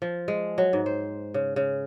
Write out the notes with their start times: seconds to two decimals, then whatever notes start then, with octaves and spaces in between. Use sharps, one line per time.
0.02 F3
0.28 G#3
0.58 F#3
0.73 G#2
0.86 C5
1.34 C#3
1.56 C#3